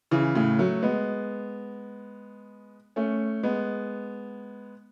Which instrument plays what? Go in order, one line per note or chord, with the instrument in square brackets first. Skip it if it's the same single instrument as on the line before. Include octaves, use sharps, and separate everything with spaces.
[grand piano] C#3 E3
A2 C#3
F#3 A3
G#3 B3
A3 C#4
G#3 B3